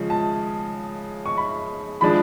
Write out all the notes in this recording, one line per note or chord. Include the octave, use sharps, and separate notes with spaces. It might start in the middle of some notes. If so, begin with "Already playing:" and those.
Already playing: C#3 F3 G#3
A5
C#6
B5
F3 G#3 D4 B5